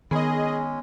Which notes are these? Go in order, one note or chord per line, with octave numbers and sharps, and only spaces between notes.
D#3 G#3 B3 C#4 G#4 D#5